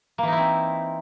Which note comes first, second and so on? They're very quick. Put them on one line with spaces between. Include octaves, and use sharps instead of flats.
A#3 E3 D#4 E4 C4